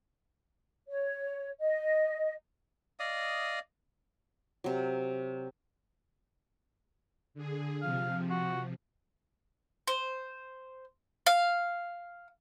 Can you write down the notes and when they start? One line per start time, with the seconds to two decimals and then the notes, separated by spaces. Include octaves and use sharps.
0.88 C#5
1.60 D#5
3.00 D5 D#5 F5 D#6
4.64 C3 F#3
7.34 D3 G#4
7.82 C3 F3 F5
8.30 F#4
9.88 C5
11.27 F5